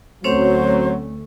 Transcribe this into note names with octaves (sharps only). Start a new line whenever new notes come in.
D2 F#3 A3 C4 C#4 C5 C#5